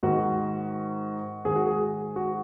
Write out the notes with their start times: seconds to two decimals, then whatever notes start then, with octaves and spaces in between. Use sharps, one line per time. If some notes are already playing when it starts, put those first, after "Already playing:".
0.03 G#2 D#3 F#4
1.45 G#2 D#3 G#4
1.56 F#4
1.67 G#4
2.16 F#4